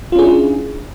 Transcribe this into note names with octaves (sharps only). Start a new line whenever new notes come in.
C#4 D4 E4 F4 G#4